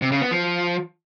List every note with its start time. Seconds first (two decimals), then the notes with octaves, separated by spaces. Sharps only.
0.02 C3
0.12 C#3
0.21 B3
0.31 F3